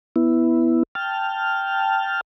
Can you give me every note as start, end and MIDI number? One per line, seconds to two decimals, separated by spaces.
0.16 0.83 59
0.16 0.83 64
0.95 2.21 79
0.95 2.21 81
0.95 2.21 89